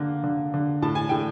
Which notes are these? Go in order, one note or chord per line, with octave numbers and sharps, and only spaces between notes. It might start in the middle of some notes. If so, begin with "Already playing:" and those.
Already playing: D3 A#3
D3
D3
A2 A5
G#5
A2 G5